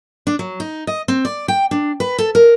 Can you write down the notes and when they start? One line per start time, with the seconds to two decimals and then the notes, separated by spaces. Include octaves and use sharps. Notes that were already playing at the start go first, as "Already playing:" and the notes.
0.27 D4
0.39 F#3
0.60 D#4
0.87 D#5
1.08 C4
1.25 D5
1.48 G5
1.71 D4
2.00 B4
2.18 A4
2.35 A#4